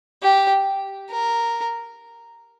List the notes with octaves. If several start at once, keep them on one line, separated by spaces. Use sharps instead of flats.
G4
A#4